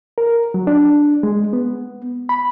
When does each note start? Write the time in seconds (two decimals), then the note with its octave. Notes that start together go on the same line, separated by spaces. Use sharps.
0.18 A#4
0.54 F#3
0.67 D4
1.23 G#3
1.53 B3
2.29 B5